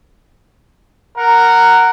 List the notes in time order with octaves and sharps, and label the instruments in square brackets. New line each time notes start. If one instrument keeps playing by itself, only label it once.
[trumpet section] A#4 F#5